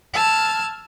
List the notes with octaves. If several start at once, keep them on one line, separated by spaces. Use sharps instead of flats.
A5 E6 F6 G#6